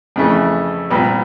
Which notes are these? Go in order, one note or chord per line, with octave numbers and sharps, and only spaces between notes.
F2 C#3 E3 A3
C2 A#2 G3 B3